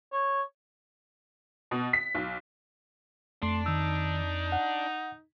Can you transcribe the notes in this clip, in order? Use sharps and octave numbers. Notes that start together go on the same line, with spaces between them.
C#5
B2
B6
B1
F2 A3 D4 C6
D#3 D#4 E6
F#5